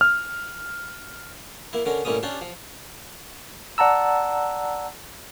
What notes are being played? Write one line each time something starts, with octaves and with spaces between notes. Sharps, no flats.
F6
A#3 E4
D3 C#4 A#4
A2 G3 A#3 C#4 D#6
C#4 D4 F4 G4
F3
D5 F#5 A5 A#5 E6